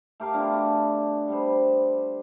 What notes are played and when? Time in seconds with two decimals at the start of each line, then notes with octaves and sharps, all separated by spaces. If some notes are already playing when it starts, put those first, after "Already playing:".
0.20 A3 G4 A#4 F5
0.34 D3 B3 D4 F4
0.53 F#4 D5 A5
1.28 G3 B3 C5